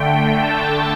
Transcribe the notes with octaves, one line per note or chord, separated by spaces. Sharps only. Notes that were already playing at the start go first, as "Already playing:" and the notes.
Already playing: D3 A3 G5
A5